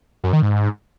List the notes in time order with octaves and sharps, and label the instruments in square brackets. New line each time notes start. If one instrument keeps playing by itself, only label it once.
[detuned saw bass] F#2
D#3
G#2